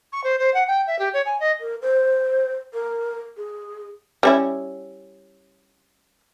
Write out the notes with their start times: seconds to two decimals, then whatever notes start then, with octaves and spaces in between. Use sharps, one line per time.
0.12 C#6
0.23 C5
0.39 C5
0.54 F#5
0.67 G5
0.87 E5
0.99 G4
1.13 C#5
1.26 G#5
1.40 D#5
1.60 A#4
1.82 C5
2.73 A#4
3.37 G#4
4.23 G3 C#4 E4